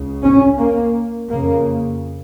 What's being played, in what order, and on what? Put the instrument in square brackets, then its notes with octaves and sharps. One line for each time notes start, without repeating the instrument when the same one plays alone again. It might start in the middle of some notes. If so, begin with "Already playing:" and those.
Already playing: [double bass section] C#2 C#3
C#4
A#3
F2 C#3 A#3